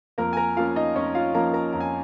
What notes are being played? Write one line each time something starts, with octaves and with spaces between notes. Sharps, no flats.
F2 A#3 A#4
G#5
A#4 A#5
F3 A#3 C#4 F4 F5
D#4 D#5
F2 C#4 C#5
F4 F5
F3 A#3 C#4 A#4 A#5
A#4 A#5
F2 A#5
G#5